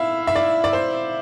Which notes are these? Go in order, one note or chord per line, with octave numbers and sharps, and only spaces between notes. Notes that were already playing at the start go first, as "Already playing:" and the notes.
Already playing: E4 E5 F5
E5
D5
D5
C5